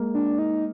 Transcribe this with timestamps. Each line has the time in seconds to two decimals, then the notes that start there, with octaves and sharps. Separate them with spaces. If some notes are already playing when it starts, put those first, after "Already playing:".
Already playing: G#3 A#3
0.14 D4
0.39 D#4